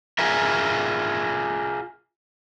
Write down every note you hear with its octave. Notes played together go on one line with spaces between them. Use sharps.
F4 G#4 A#4 E5